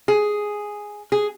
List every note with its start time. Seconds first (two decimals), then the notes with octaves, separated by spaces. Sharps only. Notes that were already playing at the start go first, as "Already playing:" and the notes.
0.08 G#4
1.12 G#4